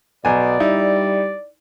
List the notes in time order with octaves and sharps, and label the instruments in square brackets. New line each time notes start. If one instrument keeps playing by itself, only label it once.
[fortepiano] B1 G#5 [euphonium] B2 [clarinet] D5
[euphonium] G3 [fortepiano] D#4 E4